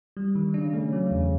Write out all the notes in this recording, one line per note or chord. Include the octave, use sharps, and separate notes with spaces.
G3
D#3
C#3 D4
A3
F#3
E2